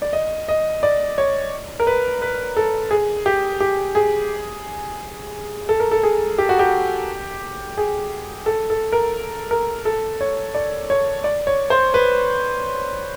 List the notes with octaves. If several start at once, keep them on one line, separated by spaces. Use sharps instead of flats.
D5
D#5
D#5
D5
C#5
A#4
B4
B4
A4
G#4
G4
G4
G#4
A4
A#4
A4
G#4
G4
F#4
G4
G#4
A4
A4
A#4
A#4
A4
C#5
D5
C#5
D5
C#5
C5
B4